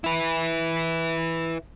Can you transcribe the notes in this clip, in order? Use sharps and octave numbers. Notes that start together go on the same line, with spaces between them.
E4 B4